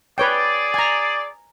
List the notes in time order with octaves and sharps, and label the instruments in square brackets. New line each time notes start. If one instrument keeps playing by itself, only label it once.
[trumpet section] G#4 D5 [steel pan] B4 C#5 G5
[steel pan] G#5 A#5